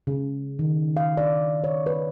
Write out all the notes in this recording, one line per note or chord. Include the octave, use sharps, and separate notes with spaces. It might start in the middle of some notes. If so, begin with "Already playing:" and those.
C#3
D#3
F5
D5
C#5
B4